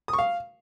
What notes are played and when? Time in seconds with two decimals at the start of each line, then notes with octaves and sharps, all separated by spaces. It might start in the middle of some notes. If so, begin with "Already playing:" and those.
0.08 D#6
0.13 C#6
0.19 F5